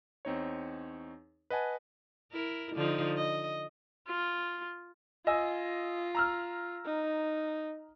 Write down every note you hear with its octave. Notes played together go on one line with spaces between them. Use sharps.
E2 C4 D#4 C#5
B4 D#5 F#5 G#5 A5
E4 A#4
D3 F3 D#4
D#5
F4
F4 D#5 G#5 E6
A#5 E6 F6
D#4